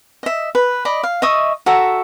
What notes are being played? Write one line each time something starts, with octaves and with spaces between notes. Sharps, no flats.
D#5 E5
B4
D5 D#5 B5
F5
D#5 E5 C#6 D#6
F#4 A4 E5 A#5